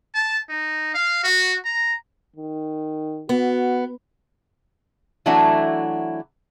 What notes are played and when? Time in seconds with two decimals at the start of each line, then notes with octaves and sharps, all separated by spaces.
0.15 A5
0.50 D#4
0.95 F5
1.24 F#4
1.66 A#5
2.36 D#3
3.29 B3 F#4
5.26 E3 F#3 A3 D4 E4 F#4